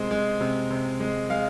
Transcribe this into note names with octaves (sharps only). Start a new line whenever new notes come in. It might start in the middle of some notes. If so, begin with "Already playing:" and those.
Already playing: C3 G#3 C5
G#3
C3
C3
G#3
G#3 F5